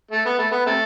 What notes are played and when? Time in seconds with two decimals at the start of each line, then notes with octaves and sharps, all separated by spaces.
0.12 A3
0.26 B3
0.39 A3
0.52 B3
0.67 C3 A3